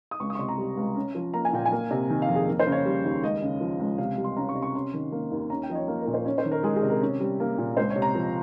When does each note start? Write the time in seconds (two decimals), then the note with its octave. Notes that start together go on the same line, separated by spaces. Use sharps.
0.11 D#6
0.20 C#2 C#6
0.30 D#6
0.35 C#6
0.39 C3 C6
0.49 A#5
0.58 G3
0.77 C#2
0.95 C#4
1.15 F3
1.34 A#3 A#5
1.45 G#5
1.53 A#2 G5
1.66 G#5
1.72 A#3
1.91 C3
2.10 D#3
2.22 F5
2.28 F2
2.35 G#4
2.48 A#3
2.59 C5
2.67 C#3
2.72 C#5
2.85 G3
3.05 D#2
3.23 C#2 D#5
3.42 C#3
3.60 F3
3.79 C#2
3.98 C3 F5
4.18 G3
4.24 C6
4.37 C#4 A#5
4.49 C#6
4.55 C3
4.62 C#6
4.74 C#4 C6
4.94 D#3
5.12 A#3
5.32 D#2
5.50 C#4 A#5
5.63 G5
5.70 F3 D#5
5.75 C#5
5.88 A#3
6.01 A#4
6.07 A#2
6.14 C5
6.25 C#4 C#5
6.38 C5
6.45 D#3
6.51 A#4
6.63 G#3 G#4
6.76 G#4
6.83 C3
6.90 A#4
7.01 C#4
7.20 G3
7.40 A#3
7.58 A#2
7.77 C#2 C5
7.90 C#5
7.96 C3
8.02 A#5
8.15 F3